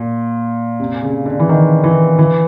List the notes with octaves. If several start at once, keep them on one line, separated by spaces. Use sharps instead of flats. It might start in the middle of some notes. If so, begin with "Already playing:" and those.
Already playing: A#2
C3
C#3
D3
E3
D#3
E3
E3